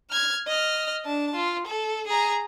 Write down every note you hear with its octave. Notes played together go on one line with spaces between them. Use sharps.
F6 G#6
D#5 F6
D4 A5
F4
A4
G#4 A#5